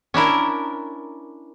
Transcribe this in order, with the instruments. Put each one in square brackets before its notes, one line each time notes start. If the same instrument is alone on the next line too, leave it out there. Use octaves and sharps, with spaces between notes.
[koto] C#4 D4 E4 A#4